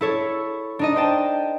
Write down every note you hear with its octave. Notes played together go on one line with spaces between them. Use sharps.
E4 A4 C#5
D4 D#4 D#5
C5 G5 A5